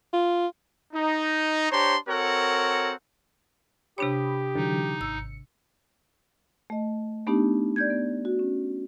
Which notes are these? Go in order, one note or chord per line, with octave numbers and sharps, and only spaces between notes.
F4
D#4
D4 G4 C5 C#5 A#5 C6
C4 F#4 A4 A#4 C#5 F#5
C3 D4 G4 C#5 B5 D#6
D3 E3 F#3 D#4
G#1 E6 C#7
A3 D#5
A3 B3 D4 D#4 G4
D5 G6 G#6
B3
F#4
C#4